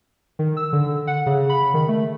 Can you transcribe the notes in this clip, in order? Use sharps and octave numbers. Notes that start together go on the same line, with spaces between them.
D#3
E6
D3
F#5
C#3
B5
D#3
A3